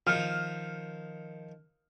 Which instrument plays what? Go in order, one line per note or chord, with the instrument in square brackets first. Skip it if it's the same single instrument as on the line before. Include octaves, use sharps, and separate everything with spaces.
[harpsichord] D#3 F3 [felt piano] F6